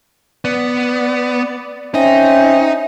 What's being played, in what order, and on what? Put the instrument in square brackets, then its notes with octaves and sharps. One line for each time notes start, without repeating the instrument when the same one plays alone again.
[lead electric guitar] B3 [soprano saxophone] D5
[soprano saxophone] C4 [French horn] C#4 [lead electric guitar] D#4 [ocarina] E5